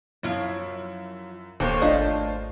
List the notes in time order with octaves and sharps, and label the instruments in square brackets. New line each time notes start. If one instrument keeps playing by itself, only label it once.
[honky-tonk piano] F#2 E4 [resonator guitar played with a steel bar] F3 F4 C#5
[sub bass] D1 [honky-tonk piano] D#2 [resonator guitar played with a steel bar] A#3 C5 C#5 [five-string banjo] A4
[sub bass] G#1 [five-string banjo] A3 D4 D#5 [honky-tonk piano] F4